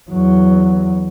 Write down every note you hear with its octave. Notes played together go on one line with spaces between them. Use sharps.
E2 F#3